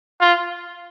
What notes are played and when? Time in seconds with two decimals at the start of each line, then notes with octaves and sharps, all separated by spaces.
0.21 F4